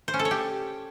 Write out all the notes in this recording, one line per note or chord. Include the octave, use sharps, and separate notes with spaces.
C5
C#4
A4
C#5
G4